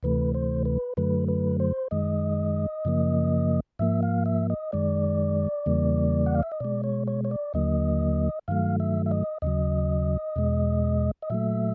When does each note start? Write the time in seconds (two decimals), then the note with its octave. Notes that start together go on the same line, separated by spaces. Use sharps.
0.03 D2 C3 E3 A3 B4
0.34 C5
0.65 B4
0.97 F#2 D3 F#3 A3 B4
1.28 B4
1.60 C5
1.91 F#2 D#3 G#3 D#5
2.85 F#2 C#3 F3 A#3
3.79 G#2 F3 A#3 E5
4.03 F5
4.26 E5
4.50 D#5
4.72 F#2 D#3 G#3 D5
5.66 E2 C#3 E3 G3 A#3
6.26 F#5
6.34 F5
6.43 E5
6.52 D#5
6.60 B2 G#3 D5
6.84 C#5
7.07 C#5
7.25 C#5
7.31 D5
7.54 D#2 D3 F#3 A#3 D#5
8.48 G2 D#3 F#3 A3 F5
8.80 E5
9.06 E5
9.11 D#5
9.42 D#2 C#3 F#3 D#5
10.36 E2 B2 G#3
11.22 D#5
11.30 A#2 F#3 A3 E5